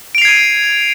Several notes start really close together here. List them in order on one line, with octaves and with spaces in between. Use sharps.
D7 F7 C7 G#6 D#7